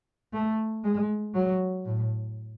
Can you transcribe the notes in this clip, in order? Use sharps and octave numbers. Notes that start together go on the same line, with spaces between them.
A3
G#3
F#3
A2